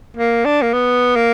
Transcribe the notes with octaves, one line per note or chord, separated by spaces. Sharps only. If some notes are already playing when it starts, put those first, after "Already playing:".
A#3
D4
A#3
B3
A#3